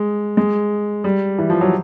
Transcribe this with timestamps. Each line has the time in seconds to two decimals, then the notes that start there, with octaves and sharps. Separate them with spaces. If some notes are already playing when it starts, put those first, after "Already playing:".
Already playing: G#3
0.37 G#3
1.04 G3
1.39 E3
1.50 F3
1.61 F#3